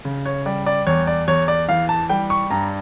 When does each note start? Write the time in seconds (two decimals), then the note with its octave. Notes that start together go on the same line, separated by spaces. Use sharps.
0.05 C#3
0.26 C#5
0.46 G3 D5
0.66 D5
0.87 E2 C#5
1.07 D5
1.28 E2 C#5
1.48 D5
1.68 E3 F5
1.89 A5
2.09 G3 G5
2.30 C#6
2.50 G2 A#5